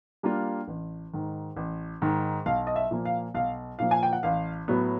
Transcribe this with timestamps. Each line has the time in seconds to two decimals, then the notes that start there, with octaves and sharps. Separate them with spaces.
0.23 G3 A#3 D4 F4
0.68 A1
1.13 G#2 D#3
1.56 A1
2.02 G#2 D#3
2.46 B1 F5
2.67 D#5
2.76 E5
2.91 A#2 F3 A#3
3.05 F5
3.35 B1 F5
3.79 A#2 F3 A#3 F5
3.91 G#5
4.03 G5
4.13 F#5
4.23 A1 F5
4.68 A2 F#3 B3